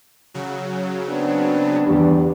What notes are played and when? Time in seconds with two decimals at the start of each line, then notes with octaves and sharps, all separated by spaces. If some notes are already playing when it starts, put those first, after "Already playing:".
0.34 C#3 F#3
1.08 B3 C4 D4
1.86 E2 G2 G3